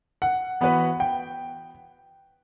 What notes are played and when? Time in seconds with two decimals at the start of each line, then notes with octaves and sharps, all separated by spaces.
0.22 F#5
0.61 E3 B3 F#4 B4
1.00 G5